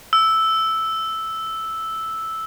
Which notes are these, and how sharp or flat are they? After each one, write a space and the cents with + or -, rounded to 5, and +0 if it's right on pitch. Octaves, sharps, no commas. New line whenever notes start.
E6 -5